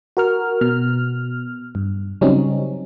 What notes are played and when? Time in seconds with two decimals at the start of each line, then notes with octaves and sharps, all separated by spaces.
0.17 F#4 A#4 F6
0.61 B2 F6
1.75 G2
2.21 C#3 F#3 G3 C4 C#4 D#4